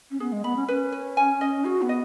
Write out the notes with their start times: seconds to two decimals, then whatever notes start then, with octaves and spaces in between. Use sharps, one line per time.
0.11 C#4
0.20 B3 G#4
0.32 G#3
0.44 B3 B5
0.56 C#4
0.68 C#4 B4
0.92 B4
1.17 G#5
1.41 D#5
1.65 F#4 G#4
1.82 B3
1.89 D#5